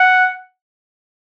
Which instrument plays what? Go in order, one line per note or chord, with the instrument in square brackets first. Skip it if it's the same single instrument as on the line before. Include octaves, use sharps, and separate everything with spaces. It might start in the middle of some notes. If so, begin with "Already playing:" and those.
Already playing: [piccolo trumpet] F#5